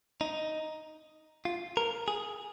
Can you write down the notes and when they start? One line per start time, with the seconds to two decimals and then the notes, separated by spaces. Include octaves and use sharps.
0.21 D#4
1.45 F4
1.77 A#4
2.08 G#4